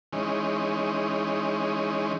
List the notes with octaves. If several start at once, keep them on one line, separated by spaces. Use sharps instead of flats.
E3 G#3 C#4 D#4